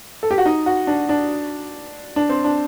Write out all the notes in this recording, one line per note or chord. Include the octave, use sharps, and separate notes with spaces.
A4
G4
F#4
D#4
F#4
D4
D4
D4
C4
D4